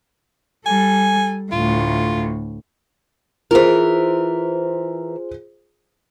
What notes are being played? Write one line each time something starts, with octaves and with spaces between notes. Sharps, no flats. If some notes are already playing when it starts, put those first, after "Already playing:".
G3 A4 G#5
D2 A2 F4
E3 F4 G#4 A#4 C5